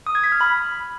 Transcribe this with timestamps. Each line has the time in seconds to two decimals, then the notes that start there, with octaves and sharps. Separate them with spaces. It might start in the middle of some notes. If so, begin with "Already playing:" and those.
0.07 D#6
0.15 G#6
0.24 B6
0.32 F6
0.41 B5